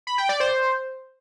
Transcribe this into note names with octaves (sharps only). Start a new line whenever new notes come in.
B5
G5
D5
C5